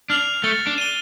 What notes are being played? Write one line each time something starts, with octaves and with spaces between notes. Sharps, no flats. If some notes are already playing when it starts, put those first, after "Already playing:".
D4 F6 C7 F7
A3 A6
D4
D#7 G7